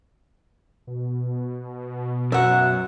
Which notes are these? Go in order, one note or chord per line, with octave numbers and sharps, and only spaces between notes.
B2
F#2 F#3 E5 F#5